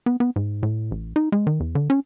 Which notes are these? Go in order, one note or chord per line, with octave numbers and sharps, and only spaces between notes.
B3
B3
G#2
A2
A1
D#4
G#3
D#3
E2
D3
C#4